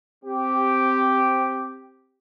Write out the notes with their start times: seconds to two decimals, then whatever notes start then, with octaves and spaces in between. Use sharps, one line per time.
0.25 C4 G4